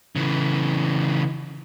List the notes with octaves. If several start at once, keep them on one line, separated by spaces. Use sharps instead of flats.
C#3 E3